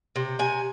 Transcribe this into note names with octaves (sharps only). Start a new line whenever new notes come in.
C3
C3 G#5